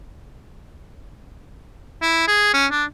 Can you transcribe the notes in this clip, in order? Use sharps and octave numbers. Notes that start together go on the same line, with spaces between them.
E4
G#4
C#4
D4